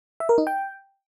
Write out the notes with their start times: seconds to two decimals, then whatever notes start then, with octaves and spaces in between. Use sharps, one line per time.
0.20 E5
0.29 A#4
0.38 D#4
0.47 G5